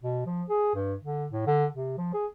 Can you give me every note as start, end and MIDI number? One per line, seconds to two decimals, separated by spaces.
0.03 0.23 47
0.26 0.43 53
0.49 0.74 68
0.75 0.94 43
1.01 1.27 50
1.32 1.44 45
1.47 1.66 50
1.72 1.98 48
1.98 2.10 53
2.13 2.26 68